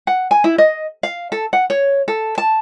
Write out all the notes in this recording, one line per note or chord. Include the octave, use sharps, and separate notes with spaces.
F#5
G#5
E4
D#5
F5
A4
F#5
C#5
A4
A5